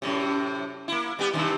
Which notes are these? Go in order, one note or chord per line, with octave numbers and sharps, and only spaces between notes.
F#2 A2 C3
A#3 E4
G3 B3 G4
G2 C3 D#3